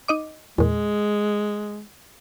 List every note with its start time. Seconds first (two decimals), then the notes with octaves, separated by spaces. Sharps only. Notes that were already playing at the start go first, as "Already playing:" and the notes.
0.08 D#4 D#5 D6
0.58 E2 A#2 G#3